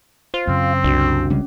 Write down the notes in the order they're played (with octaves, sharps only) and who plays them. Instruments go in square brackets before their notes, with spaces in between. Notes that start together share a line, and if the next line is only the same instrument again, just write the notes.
[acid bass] F4 [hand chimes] C5
[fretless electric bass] F#2 C#3 [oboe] C4
[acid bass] C2 [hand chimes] D4 F#4
[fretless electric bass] C#3 G3 G#3 [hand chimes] C#4